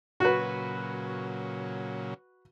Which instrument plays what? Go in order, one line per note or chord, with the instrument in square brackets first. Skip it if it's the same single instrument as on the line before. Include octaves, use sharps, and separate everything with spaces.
[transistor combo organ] A#2 C#3 F#3 [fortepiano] F#4 B4